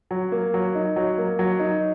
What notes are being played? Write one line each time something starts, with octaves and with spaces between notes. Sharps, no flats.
F#3
A#3
F#3
D#4
F#3
A#3
F#3
D#4